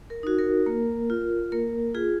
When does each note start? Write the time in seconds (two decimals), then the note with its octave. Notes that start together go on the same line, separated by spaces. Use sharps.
0.10 A#4
0.23 D#4 F#4
0.39 A#4
0.66 A#3
1.10 F4
1.52 A#3 A#4
1.94 F4 G#4